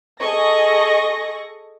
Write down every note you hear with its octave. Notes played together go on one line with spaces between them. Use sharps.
G#4 A4 D#5 C#6 A#6